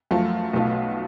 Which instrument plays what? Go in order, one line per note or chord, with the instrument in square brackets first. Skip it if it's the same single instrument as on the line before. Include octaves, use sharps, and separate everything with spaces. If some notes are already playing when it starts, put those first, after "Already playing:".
[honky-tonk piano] F#2 F3 A3 F4
B1 B2 A3 F4